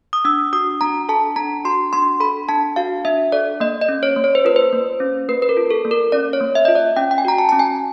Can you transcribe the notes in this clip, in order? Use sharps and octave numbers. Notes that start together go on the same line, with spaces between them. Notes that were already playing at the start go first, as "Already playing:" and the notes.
D#6
D4 E6
F#4 D#6
D4 A#5
A4 A5
D4 A#5
F#4 C6
D4 C6
A4 B5
D4 A5
F#4 F5
D4 E5
A4 D5
A#3 D#5
D#5
C#4
C#5
A#3
C#5
C5
F4 B4
C5
A#3
C#4
A#3 B4
B4
A#4
F4
A4
A#3
A#4
C#4 D5
C#5
A#3
E5
F4 D#5
D5
C#4 G5
G5
G#5
F#4 A#5
A5
C#4 A5
G#5